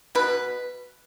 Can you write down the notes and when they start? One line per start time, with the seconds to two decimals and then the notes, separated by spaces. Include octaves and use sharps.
0.15 B2 B4